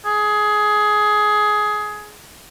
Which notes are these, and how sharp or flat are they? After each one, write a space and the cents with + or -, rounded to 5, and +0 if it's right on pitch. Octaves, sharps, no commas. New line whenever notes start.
G#4 +15